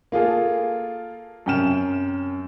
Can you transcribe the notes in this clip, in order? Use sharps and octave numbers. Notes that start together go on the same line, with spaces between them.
A#3 F4 G#4 A4
F#2 C3 G5 F6 E7